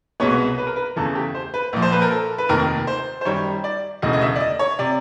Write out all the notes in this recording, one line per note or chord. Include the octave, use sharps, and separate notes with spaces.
C2 B2 G#3 B3 C#5
B4
A#4
B4
E2 C#3 E3 A3 A4
G4
C5
B4
A#1 A#2 F3
C5
B4
A#4
A4
B4
F1 D#2 D#3 A#4
C5
C5
F#2 D#3 G3 C#5
D5
E1 D2 C#3 E3 D#5
D#5
E5
D5
D#5
C#5
C3 D5